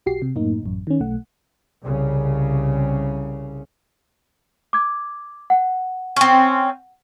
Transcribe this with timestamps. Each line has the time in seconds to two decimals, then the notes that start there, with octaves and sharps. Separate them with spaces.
0.06 B1 F#4 G4 C7
0.22 C3
0.36 F#2 A2 A#3 D#4
0.63 A1 F#2
0.87 D#3 C#4
1.00 B1 A3 F#5
1.82 C2 C#3
4.73 D6 G#6
5.50 F#5
6.16 C4 C#4